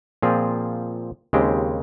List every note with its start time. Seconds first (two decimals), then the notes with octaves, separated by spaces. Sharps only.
0.22 A#2 F3 C4 F4 G#4
1.33 D#2 C#3 G#3 C4 G4